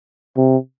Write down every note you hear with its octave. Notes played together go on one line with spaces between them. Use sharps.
C3